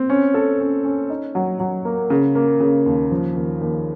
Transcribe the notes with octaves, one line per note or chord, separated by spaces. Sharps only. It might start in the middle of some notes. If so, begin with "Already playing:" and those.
Already playing: C4
C#4
A4
C#4
C#4
D#4
F#3
F#3
A#3
C#3
A#3
C#3
D#2
F3
D#2
D#2